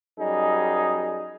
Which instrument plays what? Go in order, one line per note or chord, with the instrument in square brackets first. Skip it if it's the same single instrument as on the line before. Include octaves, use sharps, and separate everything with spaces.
[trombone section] F#2 G3 D#4 G#4